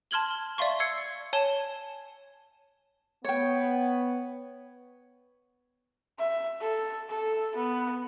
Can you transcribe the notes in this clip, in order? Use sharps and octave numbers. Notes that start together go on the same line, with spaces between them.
A5 C6 F6 G#6 F#7 G7
D5 E5 F5 C6 C#6
E6 G#6 C7 C#7
C#5 G#5 A5 E7 G7
B3 C#5 G5
E5
A4
A4
B3